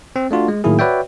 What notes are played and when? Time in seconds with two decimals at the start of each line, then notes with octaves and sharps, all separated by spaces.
0.16 C4
0.31 A3 D4 F4 F#4
0.48 G#3
0.64 A2 D#3 F#3 A#3 E4 G#4
0.79 F#4 B4 C#5 D5 E5 G5